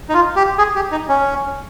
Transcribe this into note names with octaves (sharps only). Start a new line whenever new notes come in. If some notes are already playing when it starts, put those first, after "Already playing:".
D#4
F4
G4
G#4
G4
D#4
C#4